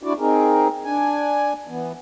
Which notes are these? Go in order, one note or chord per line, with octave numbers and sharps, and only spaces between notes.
D4 E4 F#4 D5
C4 D#4 G#4 A#4
D4 G#5
E3 B3